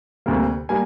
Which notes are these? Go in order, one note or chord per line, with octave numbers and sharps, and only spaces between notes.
D2 C3 G3 A#3
G3 A#3 G#5